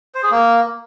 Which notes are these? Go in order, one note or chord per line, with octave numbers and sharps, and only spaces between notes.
C5
G#4
A#3